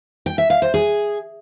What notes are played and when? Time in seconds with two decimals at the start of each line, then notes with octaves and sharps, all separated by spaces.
0.26 G5
0.38 E5
0.50 F5
0.62 C5
0.74 G#4